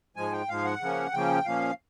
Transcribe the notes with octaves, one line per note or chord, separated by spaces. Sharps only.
G#2 F3 G#3 G#5
G5
G#2 F3 G#3 F5
F#5
C#3 F3 A#3 C#4
C#3 F3 A#3 C#4 G5
A#2 F3 A#3 C#4 F5